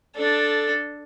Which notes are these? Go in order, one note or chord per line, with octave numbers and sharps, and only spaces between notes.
D4 A4